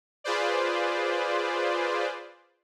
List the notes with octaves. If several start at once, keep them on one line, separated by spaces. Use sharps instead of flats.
F4 G#4 B4 C5 D5